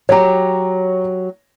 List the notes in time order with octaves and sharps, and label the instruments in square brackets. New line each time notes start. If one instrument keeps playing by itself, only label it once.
[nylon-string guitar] F#3 G4 [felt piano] C#5 A#5